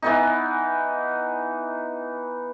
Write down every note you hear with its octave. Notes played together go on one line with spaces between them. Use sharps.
E3 B3 D#4